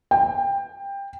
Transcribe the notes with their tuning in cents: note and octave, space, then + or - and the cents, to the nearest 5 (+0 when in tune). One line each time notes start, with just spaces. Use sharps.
G5 +20